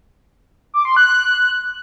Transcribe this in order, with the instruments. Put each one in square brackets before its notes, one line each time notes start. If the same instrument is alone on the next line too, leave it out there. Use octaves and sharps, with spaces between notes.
[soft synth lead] D6
C6
F#6